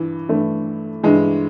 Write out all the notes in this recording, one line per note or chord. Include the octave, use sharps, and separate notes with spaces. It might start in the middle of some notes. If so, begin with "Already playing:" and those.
Already playing: G2 E3
G2 E3 A3
G2 E3 G#3